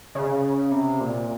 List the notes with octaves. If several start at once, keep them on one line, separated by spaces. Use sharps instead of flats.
C#3
C3
A#2